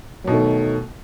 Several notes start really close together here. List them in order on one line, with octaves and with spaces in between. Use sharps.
F#3 B2 D#3 A3